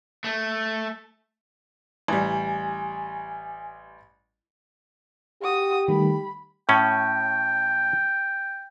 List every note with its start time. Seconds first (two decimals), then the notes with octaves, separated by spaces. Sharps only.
0.24 A3
2.08 A1 G3 G#5
5.42 F#4 G4 D#6
5.88 D#3 G3 A3 B5
6.69 A2 C#4 G5